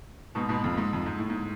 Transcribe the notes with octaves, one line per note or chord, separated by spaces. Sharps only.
G#2 B2
G#2 B2
F2
G#2
F2
G#2
A2
G#2